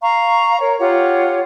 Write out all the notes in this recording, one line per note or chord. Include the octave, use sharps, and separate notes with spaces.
F5 A#5 C#6
A#4 C#5
F4 G4 C#5 F#5